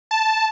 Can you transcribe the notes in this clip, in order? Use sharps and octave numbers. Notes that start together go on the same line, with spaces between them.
A5